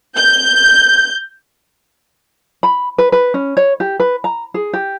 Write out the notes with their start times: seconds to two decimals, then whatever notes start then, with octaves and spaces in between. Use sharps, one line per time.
0.16 G6
2.63 B5
2.98 B4
3.12 B4
3.34 C#4
3.57 C#5
3.80 G4
4.00 B4
4.24 A#5
4.54 G#4
4.73 G4